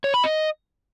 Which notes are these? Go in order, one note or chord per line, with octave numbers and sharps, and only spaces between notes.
C#5
B5
D#5